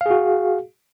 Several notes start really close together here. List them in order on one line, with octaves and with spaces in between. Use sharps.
F5 G#4 F#4